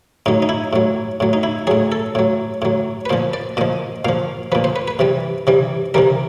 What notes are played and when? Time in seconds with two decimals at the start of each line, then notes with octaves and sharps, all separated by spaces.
0.26 A2 F#3 D#4
0.42 D#4
0.49 E4
0.73 A2 F#3
1.20 A2 F#3
1.33 D#4
1.43 E4
1.67 A2 F#3 G#4
1.92 A4
2.15 A2 F#3
2.62 A2 F#3
3.06 B4
3.09 A#2 F3 C5
3.33 D5
3.57 A#2 F3 D#5
4.05 A#2 F3 F5
4.52 F3 B4
4.55 A#2
4.64 C5
4.76 B4
4.88 B4
4.99 C3 E3 G3
5.47 C3 E3 G3
5.94 C3 E3 G3 A#4